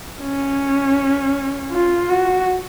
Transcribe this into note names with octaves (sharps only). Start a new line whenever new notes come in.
C#4
F4
F#4